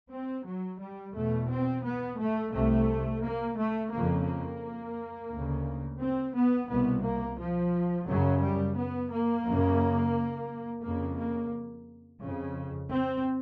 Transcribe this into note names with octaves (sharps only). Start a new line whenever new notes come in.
C4
F#3
G3
E2 B2 A3
C4
B3
A3
C2 C3 A3
A#3
A3
F2 C#3 A#3
A#3
D2 C#3
C4
B3
C2 B2 B3
A#3
F3
F#2 C#3 F#3
G3
B3
A#3
F#2 C#3
F2 C#3 A#3
A#3
F2 C#3
C4